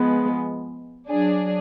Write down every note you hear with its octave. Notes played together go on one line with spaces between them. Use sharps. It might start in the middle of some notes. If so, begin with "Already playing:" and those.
Already playing: F3 G#3 B3
F#3 D4 G#4